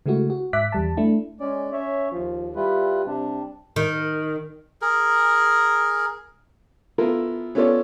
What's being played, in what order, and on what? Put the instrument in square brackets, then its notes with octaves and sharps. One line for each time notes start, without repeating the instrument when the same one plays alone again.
[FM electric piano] C#3 G#3 A3 E4 F#4
F#4
G#2 E5 D6 F#6 B6
E2 G3 A5
A3 D4 E4
[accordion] G#3 D5 [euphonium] C#4
[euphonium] C#4 [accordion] C#5 E5
[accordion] D#2 [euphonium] F3
[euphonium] G3 [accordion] E4 F4 B4
[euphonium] C3 [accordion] G3 D4
[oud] D#3
[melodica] G#4 A#4
[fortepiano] B3 E4 F4 A4 A#4
B3 C#4 F4 A4 C#5 D5